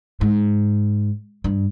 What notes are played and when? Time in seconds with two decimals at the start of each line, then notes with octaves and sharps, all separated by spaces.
0.21 G#2
1.44 G2